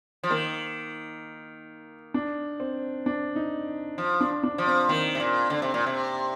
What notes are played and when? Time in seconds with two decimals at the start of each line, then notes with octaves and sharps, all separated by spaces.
0.23 F3
0.30 D#3 A#3
2.14 D4
2.60 C4
3.06 D4
3.36 D#4
3.98 F3
4.21 D4
4.44 D4
4.58 F3
4.66 C4
4.88 D#3 A#3
5.15 C3
5.20 A#2
5.50 D3
5.62 C3
5.74 A#2
5.86 C3